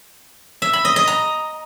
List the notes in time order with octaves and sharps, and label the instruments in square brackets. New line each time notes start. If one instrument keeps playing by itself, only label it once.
[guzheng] E5
B5
D#5
D#5
A#5